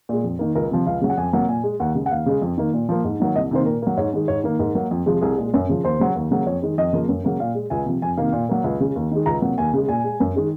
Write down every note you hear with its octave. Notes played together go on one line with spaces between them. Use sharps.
A#2 G#3
F2
D#3 A#3
C#2 A#4
C3 F3
C#2 F5
C#3 F#3
F#5
F2 G#5
C3 F#3 A#3
A#2 G#5
G#3
D#2 F#5
C#3 G#3
F#5
D#2 F5
C#3 G#3
F2
D#3 A#3
A#2
F3 A#3
G#2
D#3 F#3 A#3
C2 D#5
C3 D#3 A#3 C5
A#2 A#4
F#3 A#3
G#2 C#5
D#3 G#3
G#2 C#5
D#3 A#3
G#2 A#4
F#3 A#3
F2
C3 F3 G#3
C2 G#4
A#2 G#3
F#2
C#3 F3
D#2 C5
C#3 F#3
D#2
C#3 F#3 A#3
F2 C#5
D#3 G#3
F2 D#5
C#3 F3 A#3
F#2
C#3 F#3 A#3
A#2 F5
G#3
C#2 G#5
C3 F3
F2 G#5
C3 D#3 A#3 F5
A#2
F#3 A#3
C#2
C#3 G#3
D#2
D#3 G#3
C#2 A#5
C3 F#3 A#3
D#2 G#5
C#3 G#3
A#2 G#5
G#3
F#2
D#3 G#3